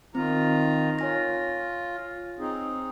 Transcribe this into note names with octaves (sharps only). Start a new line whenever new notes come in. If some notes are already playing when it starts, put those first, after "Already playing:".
D#3 C4 F4 A#5
F4 C#5 G#5 A#6
C4 D#4 G#4